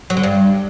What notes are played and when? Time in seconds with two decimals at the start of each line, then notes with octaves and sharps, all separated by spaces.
0.10 F#3
0.17 D3
0.23 G2